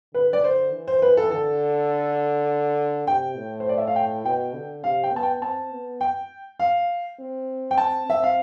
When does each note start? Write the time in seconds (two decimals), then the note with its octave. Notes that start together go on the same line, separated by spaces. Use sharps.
0.14 D3 B4
0.33 D5
0.44 C5
0.73 E3
0.88 C5
1.02 B4
1.17 A4
1.31 D3 A4
3.07 C3 G5
3.37 A2
3.60 C5
3.69 D5
3.78 E5
3.87 F5
3.96 G5
4.25 B2 G5
4.54 D3
4.84 C3 F5
5.03 G5
5.13 B3 A5
5.23 G5
5.42 C4 A5
5.72 B3
6.01 G5
6.60 F5
7.19 C4
7.71 G5
7.77 C4 A5
8.07 C4 E5
8.23 F5